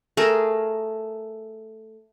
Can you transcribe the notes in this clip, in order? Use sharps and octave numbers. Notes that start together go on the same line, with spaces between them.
A3 G#4 A#4